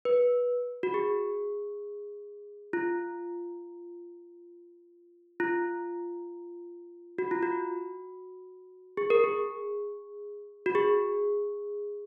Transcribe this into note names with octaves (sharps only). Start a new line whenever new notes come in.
B4
F#4
G#4
F4
F4
F#4
F4
F#4
G#4
A#4
G#4
F#4
G#4